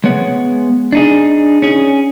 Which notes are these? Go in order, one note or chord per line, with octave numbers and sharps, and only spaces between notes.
G#3 B3 C#5 F#5
D4 D#4 G#4
C#4 G#4